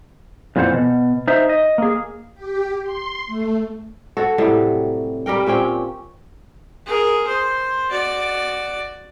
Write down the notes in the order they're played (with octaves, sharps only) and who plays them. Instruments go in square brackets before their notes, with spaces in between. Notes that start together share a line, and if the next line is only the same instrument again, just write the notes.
[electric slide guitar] F2 A#2 E3 C4 C5 F#5
B2
D#4 C5 E5
D#5
A#3 G#4
[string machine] G4
C6
A3
[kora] F#4 A4 C#5
A2 C3 F#3 G3
G3 G4 A#4 G5
A#2 C4 C#4 G5
[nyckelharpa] G#4 A#4
C5
F#4 D5